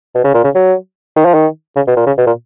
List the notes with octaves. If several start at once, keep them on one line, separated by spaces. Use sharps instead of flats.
B2
C#3
A#2
C#3
F#3
D#3
F3
D#3
C#3
B2
A#2
C#3
B2
A#2